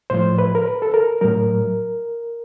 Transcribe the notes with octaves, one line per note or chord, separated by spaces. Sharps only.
A2 F3 C5
B4
A#4
B4
A4
A#4
A2 F#3 A#4